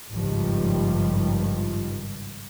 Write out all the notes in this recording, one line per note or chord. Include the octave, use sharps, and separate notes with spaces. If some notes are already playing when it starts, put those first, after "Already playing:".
G#1 C#2 G2 D#3 F3 G3